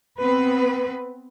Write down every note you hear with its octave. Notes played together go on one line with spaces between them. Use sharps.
B3 C4 B4